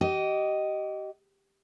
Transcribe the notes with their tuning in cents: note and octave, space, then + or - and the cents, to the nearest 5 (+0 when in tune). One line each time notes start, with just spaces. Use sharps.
G4 -30 D#5 +0